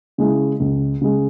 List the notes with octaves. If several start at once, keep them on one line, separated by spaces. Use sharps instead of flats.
C#3 G#3 E4
C#2
C#3 G#3